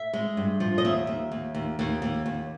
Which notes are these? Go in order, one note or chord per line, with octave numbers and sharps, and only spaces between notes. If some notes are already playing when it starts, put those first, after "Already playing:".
Already playing: E5
G#3
G2
F3
D#5
D#2 E5
D#2
D#2
D#2
D#2
D#2
D#2